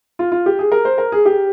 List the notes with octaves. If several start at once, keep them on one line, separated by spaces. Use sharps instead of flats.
F4
F4
G4
G#4
A#4
C5
A#4
G#4
G4